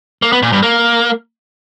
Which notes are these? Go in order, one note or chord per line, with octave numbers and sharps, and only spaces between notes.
A#3
B3
A#2
G2
A#3